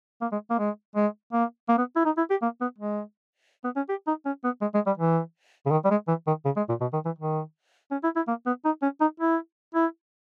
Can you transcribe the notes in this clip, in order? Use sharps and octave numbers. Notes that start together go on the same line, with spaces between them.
A#3
G#3
A#3
G#3
G#3
A#3
A#3
B3
E4
D#4
E4
G4
A#3
B3
G#3
B3
C#4
G4
D#4
C#4
B3
G#3
G#3
G3
E3
C#3
D#3
G3
G#3
E3
D#3
C#3
G#3
A#2
B2
D#3
E3
D#3
C#4
E4
E4
A#3
B3
D#4
C#4
D#4
E4
E4